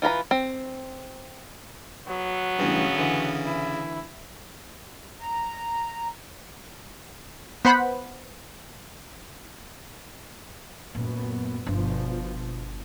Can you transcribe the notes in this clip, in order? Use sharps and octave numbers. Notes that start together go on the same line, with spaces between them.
E3 F4 B4 A#5
C4
F#3 B3
A1 G2 C#3
D3 E3
E4
A#5
B3 C5 F#5 B5
F#2 A#2 B3
G1 B2 F3